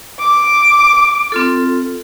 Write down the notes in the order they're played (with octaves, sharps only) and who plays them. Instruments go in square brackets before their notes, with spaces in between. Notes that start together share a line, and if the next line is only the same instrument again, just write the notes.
[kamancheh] D6
[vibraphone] C4 F4 A4